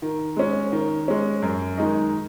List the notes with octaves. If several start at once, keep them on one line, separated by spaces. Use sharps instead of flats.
D#3
G#3 C#4
D#3
G#3 C#4
F#2
D#3 G#3 D#4